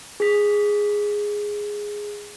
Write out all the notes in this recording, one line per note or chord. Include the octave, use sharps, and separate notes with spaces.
G#4 B6